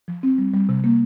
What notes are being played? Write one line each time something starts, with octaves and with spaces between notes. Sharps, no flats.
F3
C4
G3
G3
C3
A#3